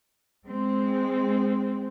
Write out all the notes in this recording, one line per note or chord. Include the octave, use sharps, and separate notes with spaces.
G#3 C4